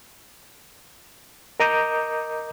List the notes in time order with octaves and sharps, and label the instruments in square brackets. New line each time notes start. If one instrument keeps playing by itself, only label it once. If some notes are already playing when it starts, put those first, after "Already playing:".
[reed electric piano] A#4 D#5 A#5 D6 D#6 G6